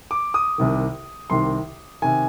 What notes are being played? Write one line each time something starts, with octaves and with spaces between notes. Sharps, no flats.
D6
D#6
C2 C3 D#3
C2 C3 D#3 C6
C3 D#3 G#5